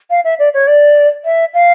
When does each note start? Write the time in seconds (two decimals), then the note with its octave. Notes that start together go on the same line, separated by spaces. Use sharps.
0.10 F5
0.24 E5
0.38 D5
0.53 C#5
0.67 D5
1.24 E5
1.53 F5